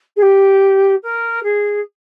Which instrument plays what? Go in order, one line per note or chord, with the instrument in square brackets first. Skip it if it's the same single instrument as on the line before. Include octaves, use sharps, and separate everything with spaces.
[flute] G#4
G4
A#4
G#4